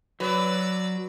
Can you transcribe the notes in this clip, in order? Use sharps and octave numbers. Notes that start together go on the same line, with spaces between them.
F#3 B4 D5 E6